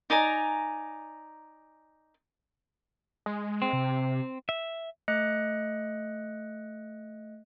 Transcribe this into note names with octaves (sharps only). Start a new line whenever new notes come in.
D#4 D5 G#5 A#5
G#3
C4
C3
E5
A3 D#5 F#6 C#7